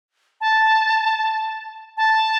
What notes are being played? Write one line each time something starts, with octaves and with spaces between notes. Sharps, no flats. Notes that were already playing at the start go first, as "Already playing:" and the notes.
A5
A5